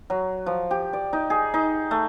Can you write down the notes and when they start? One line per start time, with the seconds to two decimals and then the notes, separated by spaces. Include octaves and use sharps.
0.10 F#3
0.46 F3
0.71 G4
0.93 D5
1.13 D#4
1.30 G#4
1.54 D#4
1.91 A3